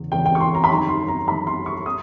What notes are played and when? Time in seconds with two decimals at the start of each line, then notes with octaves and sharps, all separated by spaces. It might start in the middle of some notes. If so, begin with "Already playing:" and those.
Already playing: E2 C#3
0.11 E2 C#3 E3 G#3 G5
0.26 G5
0.35 C#6
0.40 C6
0.55 A#5
0.64 B5
0.70 F#2 D#3 G3 C6
0.89 C6
1.08 A#5
1.27 F#2 D#3 G3 B5
1.47 C6
1.66 C#6
1.86 D#6